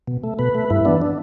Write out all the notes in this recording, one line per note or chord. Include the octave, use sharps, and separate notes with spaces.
B2
A3
B2 B4
A3
G2 E4
E3 B3 D4
D4